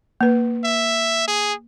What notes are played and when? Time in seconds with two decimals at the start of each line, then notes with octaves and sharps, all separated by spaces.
0.21 A#3 B4
0.64 E5
1.28 G#4